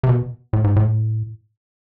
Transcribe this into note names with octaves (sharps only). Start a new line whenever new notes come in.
C3
B2
A2
G#2
A2